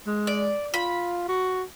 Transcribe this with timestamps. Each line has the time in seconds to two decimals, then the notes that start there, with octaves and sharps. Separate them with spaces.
0.07 G#3
0.27 D5
0.74 F4 B5
1.29 F#4